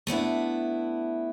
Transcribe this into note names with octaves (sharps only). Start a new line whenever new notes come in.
A3 B3 D4 E4